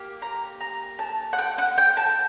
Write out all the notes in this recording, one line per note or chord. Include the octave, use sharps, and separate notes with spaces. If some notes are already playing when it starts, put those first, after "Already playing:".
Already playing: A#3 G4
A#5
A#5
A5
F#5
G5
F#5
G5
A5